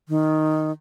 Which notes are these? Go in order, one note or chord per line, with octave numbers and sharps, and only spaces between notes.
D#3